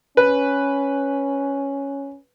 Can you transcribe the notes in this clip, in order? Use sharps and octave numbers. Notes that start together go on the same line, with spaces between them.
C#4 B4